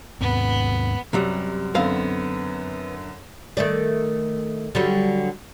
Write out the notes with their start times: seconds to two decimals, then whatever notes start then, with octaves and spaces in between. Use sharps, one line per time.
0.21 D#2 G#2 B3 C4
1.13 F#2 C3 F#3 G3
1.75 F#2 D3 B3 C4 F5
3.57 D#3 A3 D5
4.75 D3 F#3 G3